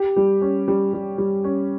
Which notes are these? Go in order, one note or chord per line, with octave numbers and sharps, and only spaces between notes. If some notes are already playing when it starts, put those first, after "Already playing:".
Already playing: G4
G3
C#4
G3
G3
G3
C#4